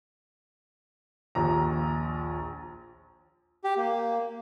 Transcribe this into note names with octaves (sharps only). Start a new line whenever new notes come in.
A#1 D#2 A#5
G4
A#3